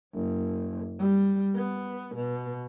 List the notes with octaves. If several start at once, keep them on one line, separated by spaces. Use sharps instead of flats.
F#1
G3
B3
B2